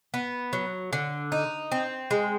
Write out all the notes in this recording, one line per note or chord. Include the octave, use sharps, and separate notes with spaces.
B3
F#3
D3
D#4
C4
G#3